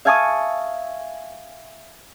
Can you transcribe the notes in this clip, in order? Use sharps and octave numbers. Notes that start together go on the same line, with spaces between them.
E5 F5 G#5 A5 C#6 D#6